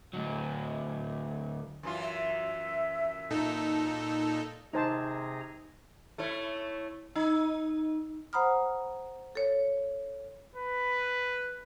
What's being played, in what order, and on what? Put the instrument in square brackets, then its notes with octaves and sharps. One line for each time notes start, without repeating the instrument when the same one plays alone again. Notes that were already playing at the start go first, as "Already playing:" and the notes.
[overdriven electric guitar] D2 F#3
[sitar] F#2 E3 F4
[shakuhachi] E5
[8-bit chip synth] A#2 D#4 A4
[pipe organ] C3 G#4 A#5 [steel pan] D#4 C5 A5
[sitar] A3 E4 C#5
D#4
[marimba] C5 F#5 A#5 B5 D#6 F6
A4 C#5
[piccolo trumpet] B4